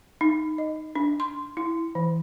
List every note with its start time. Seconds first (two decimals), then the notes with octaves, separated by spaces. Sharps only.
0.21 D#4
0.58 D#5
0.95 D4
1.20 C6
1.57 E4
1.95 E3